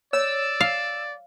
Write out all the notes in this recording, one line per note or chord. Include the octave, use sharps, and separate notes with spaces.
C#5 D5 E6
F5